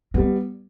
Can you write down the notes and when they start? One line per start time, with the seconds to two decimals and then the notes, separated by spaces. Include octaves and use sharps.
0.14 A2 G3 B3